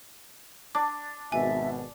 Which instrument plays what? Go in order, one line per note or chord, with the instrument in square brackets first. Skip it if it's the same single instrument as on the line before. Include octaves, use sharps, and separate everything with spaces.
[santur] D4 [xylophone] D6
[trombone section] G#1 B2 [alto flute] E5 [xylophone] G#5